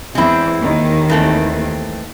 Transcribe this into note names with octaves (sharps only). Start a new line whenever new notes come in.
E2 E3 G#3 C4 E4
D#2 D#3
E3 A3 C4